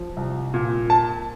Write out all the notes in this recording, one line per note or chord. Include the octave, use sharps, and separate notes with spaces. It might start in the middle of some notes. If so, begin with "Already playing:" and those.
Already playing: F3
C2
A#2
A5